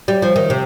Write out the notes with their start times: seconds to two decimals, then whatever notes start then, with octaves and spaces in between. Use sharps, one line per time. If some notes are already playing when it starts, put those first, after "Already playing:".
0.08 G3
0.22 F3
0.36 D#3
0.50 C3